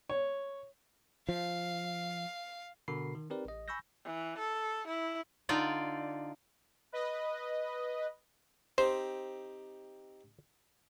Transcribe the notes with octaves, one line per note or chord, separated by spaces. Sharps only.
C#5
F3 F5
B2 D3 F#4 A#4 B5 C7
D#3
C4 D#4 G4 A#4 B4 D5
A1 D#5
G#5 B5 C#6 E6 G6 A#6
E3
A4
E4
D3 D#4 F4 D5
B4 D#5
C4 D#4 G4 C5